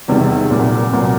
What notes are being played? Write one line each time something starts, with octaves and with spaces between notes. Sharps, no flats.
E2 C3 D#3 G3
C2 A#2 F#3
C2 A#2 F#3